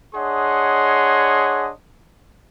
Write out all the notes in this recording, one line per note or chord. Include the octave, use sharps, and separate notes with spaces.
D4 G#4 C#5 D#5 F#5 C6